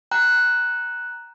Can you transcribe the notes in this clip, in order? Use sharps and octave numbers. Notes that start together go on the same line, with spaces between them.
G5 A#5 F#6